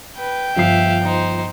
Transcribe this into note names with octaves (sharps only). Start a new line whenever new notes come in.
B4 G5
G1 F3 E5 F5 C7
D#4 C5